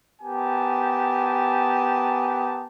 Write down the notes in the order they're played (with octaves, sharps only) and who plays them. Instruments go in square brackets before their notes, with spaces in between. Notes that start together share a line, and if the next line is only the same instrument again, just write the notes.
[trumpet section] B3 G4 A#4 G#5 A5